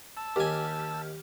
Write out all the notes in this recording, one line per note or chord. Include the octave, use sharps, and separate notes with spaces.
A5 E6
D#2 G4 G#5 F6